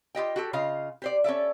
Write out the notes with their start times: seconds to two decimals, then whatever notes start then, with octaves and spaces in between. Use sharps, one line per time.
0.15 F4 G4 D#5 G5
0.36 F#4 G4 A4
0.53 C#3 F4 D#5 F5
1.02 G4 C5 D5
1.24 C#4 A4 D5 E5